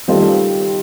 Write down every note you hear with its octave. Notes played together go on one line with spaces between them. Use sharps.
D#3 G3 C4 F4 A4